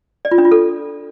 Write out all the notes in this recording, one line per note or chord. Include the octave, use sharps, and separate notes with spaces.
D5
F4
D4
F4
A4